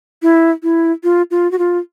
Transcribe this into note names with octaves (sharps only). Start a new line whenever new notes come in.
E4
E4
F4
F4
F#4
F4